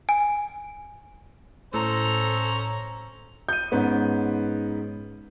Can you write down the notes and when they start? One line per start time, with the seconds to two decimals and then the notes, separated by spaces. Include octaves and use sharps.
0.09 G#5
1.74 A2 C#4 A4 C5 A#5
3.49 G6 D#7
3.72 G#2 B3 C#4